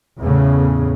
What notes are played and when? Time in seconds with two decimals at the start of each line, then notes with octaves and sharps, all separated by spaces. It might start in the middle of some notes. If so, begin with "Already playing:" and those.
0.21 E2 A2 C#3